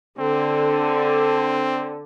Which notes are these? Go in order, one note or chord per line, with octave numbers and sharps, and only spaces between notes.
D3 C4